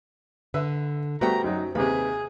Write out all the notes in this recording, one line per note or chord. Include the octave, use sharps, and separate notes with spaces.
D3 B4 E5
G3 A3 B3 F#4 C5 G5 A#5
F#2 F#3 D#4
D#2 C3 G#4 B4